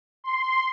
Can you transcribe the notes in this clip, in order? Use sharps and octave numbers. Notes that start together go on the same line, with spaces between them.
C6